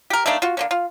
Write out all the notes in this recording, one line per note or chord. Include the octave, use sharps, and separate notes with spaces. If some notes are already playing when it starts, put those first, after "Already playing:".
G4 A#4
A3 A#3 D4 D#4
F4 F#4
D3 A#3 C#4
F4